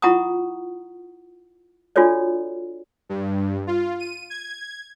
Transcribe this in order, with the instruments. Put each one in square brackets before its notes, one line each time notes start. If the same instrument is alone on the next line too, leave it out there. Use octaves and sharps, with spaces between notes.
[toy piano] E4 F4 F#5 A#5 C#6 D#6
D4 F4 F#4 A4 C#5 D5
[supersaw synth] G2
F4
D#7
G#6